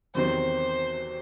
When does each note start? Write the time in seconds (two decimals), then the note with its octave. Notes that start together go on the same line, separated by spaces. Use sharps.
0.14 E2 C3 D#3 F#3 C4 C5